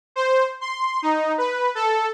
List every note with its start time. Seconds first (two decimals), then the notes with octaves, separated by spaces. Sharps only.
0.16 C5
0.61 C6
1.02 D#4
1.38 B4
1.75 A4